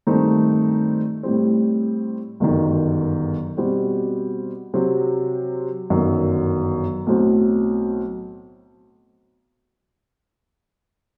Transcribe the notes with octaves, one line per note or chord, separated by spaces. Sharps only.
G2 D#3 A3 C4 D#4
A2 G3 C4
G1 F#2 D#3
B2 G3 C4 F#4
C3 F#3 C4
G1 F#2 D#3 F#3
B1 A2 F#3 C4 F#4